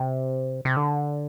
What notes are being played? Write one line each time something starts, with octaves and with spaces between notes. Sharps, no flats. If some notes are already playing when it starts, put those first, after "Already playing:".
Already playing: C3
C3
D3